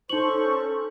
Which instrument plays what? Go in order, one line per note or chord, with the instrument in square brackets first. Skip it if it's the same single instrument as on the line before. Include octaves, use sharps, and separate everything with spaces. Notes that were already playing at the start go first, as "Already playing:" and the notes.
[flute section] C#4 A4 [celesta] D#4 F#7 [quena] C5 [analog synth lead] C#6